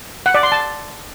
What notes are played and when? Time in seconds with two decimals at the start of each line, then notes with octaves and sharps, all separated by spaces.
0.26 F#5
0.34 D5
0.43 C6
0.52 A5